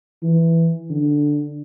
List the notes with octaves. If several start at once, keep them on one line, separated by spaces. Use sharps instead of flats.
E3
D3